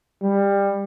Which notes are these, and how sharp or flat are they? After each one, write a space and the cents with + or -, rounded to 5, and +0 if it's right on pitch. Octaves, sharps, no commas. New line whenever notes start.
G3 +20